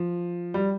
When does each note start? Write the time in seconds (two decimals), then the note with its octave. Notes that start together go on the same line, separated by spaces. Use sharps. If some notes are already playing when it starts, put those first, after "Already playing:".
Already playing: F3
0.54 G3